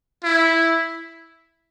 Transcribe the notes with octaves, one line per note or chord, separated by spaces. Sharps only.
E4